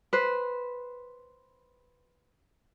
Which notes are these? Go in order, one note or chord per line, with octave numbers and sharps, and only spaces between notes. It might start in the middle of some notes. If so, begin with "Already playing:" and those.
B4 C5